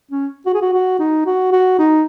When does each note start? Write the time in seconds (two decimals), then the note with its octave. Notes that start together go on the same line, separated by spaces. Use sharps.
0.11 C#4
0.46 F#4
0.54 G#4
0.62 F#4
0.73 F#4
0.99 D#4
1.26 F#4
1.52 F#4
1.79 D#4